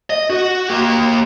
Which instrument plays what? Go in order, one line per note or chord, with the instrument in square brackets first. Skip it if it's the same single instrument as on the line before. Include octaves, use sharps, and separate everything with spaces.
[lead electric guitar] D#5
F#4
A#3 G4